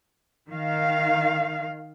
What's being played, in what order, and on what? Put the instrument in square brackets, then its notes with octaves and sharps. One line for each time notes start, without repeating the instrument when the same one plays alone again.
[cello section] D#3 F5